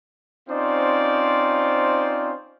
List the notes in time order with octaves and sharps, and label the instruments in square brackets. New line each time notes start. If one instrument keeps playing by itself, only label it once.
[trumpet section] C4 C#4 D#4 F4 C5 D5